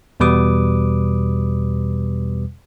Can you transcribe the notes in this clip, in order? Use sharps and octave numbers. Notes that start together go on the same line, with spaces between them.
E2 B2 G3 B4 D6 D#6